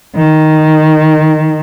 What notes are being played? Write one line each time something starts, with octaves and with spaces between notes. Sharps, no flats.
D#3